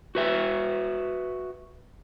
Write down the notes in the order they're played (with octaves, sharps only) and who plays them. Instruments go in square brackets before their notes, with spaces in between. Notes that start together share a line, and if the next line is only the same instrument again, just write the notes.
[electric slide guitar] F#4 B4 E5